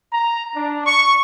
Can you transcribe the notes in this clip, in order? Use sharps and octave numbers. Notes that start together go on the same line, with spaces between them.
A#5
D4
C#6